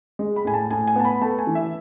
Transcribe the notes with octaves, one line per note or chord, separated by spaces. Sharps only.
G#3
B5
A2 G#5
A5
A2 G#5
G#5
B3 A5
B5
A3 A5
G#5
E3
E5